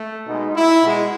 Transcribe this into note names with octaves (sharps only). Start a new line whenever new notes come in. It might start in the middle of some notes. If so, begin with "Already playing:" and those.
Already playing: A3
B2 G#3 D#4
E4
B2 G#3